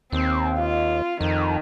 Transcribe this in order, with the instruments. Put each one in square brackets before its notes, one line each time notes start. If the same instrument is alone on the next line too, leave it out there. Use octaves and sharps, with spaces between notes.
[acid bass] D#2 [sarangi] C4
[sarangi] F4
[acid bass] F2 [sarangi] D#3